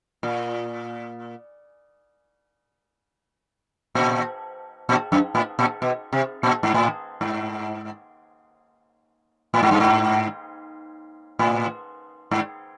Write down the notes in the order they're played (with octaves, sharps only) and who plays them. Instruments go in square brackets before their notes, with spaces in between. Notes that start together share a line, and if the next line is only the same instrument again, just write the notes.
[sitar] A#2
A#2
A#2
F#2
A2
A#2
B2
C3
A#2
G#2
A2
G#2
A2
G#2
G2
G#2
A2
G#2